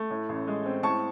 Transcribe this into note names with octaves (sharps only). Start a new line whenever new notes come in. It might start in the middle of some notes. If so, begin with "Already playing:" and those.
Already playing: A3
A2
A1
G#3
C4
A2 A5 C#6